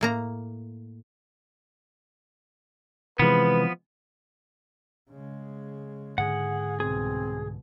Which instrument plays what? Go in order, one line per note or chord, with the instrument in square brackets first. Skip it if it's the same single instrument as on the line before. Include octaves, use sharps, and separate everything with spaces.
[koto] A2 A#3 A#5
[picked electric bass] C3 E3 G#3 [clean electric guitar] F3 B3 [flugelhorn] B4
[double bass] C#3 G#3
[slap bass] G#2 D3 [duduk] G#4 [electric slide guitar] F#5
[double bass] C2 B2 [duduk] C4 [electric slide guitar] G#4